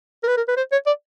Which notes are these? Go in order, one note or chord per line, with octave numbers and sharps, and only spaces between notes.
A#4
B4
A#4
B4
C5
C#5
D5